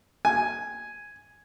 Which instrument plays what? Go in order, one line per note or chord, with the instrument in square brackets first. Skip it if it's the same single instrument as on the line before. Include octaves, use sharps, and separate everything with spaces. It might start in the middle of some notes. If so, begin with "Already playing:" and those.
[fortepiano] G#5